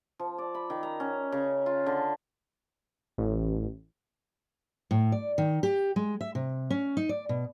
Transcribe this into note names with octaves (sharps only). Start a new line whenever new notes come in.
F3
D5
B5
D#3
A#5
C#4
C#3
F4
D3
A1
A2
D5
D#3
G4
G#3
E5
C3
C#4
D#4
D5
B2